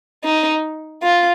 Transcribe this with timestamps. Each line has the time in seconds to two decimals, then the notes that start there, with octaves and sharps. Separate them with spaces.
0.24 D#4
1.03 F4